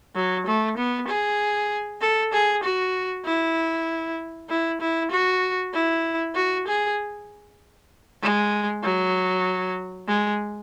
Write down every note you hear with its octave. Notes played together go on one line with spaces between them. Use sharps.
F#3
A3
B3
G#4
A4
G#4
F#4
E4
E4
E4
F#4
E4
F#4
G#4
G#3
F#3
G#3